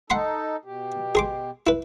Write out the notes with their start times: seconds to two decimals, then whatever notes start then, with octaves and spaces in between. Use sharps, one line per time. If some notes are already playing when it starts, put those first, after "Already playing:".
0.10 D#4 A4 F#5 B5 C6
0.65 B2 G4
1.15 G#4 C6 D6
1.67 E4 B4